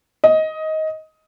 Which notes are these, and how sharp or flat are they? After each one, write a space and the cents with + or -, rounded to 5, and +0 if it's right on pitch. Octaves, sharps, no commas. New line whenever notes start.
D#5 +15